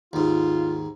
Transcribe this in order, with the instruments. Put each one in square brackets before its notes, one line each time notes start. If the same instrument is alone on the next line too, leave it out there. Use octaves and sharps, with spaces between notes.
[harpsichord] D#2 G#2 [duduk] F4